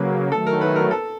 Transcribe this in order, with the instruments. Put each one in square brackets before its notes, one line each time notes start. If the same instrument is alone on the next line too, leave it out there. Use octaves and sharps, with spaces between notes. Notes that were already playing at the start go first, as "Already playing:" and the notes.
Already playing: [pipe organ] C#3 F#3 A#3 [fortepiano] B4
[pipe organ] D#3 F#3 A3 [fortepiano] A4
[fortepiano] A#4
B4
A#4
A4